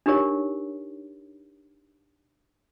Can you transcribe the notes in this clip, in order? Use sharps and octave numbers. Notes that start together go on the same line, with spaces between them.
D4 D#4 G4 A#4 C#5